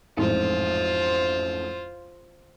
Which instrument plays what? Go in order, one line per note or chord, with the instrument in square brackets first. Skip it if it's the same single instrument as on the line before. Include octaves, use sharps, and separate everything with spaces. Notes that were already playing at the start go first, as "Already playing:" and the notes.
[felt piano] A1 F2 G#2 [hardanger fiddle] F4 C5